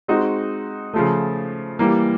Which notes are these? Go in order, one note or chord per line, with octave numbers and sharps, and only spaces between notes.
G#3 C4 D#4 F#4
C#3 F3 A3
E3 G3 A#3